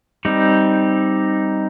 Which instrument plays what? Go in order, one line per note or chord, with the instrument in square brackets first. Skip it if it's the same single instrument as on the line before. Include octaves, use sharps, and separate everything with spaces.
[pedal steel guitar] G3 C4 D#4